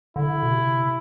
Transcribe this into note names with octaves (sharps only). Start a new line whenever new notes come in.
D3 E4
B2
C3